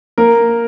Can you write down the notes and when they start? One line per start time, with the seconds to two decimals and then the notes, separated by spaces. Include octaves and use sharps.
0.18 A#3 A#4